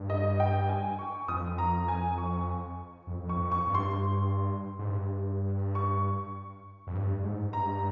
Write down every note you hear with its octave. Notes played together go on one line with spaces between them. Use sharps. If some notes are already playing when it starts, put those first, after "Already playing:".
Already playing: G2
D#5
G5
G#5
C#6
F2 D#6
A#5
G#5
C#6
F2
F2
C#6
F2
C#6
G2
C6
G#2
G2
C#6
F2
G2
G#2
G2 A#5